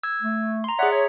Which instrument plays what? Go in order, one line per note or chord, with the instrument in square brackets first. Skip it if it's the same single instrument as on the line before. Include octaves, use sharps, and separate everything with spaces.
[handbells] E6 G#6
[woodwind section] A3
[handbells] A#5 C6
[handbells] G#4 E5 [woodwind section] C#5 D5 F#5
[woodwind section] C#5